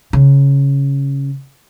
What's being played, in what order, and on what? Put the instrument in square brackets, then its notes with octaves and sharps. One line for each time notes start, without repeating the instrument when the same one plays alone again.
[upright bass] C#3